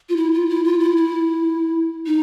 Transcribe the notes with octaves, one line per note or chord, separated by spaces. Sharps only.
F4
E4
F4
E4
F4
E4
E4
D#4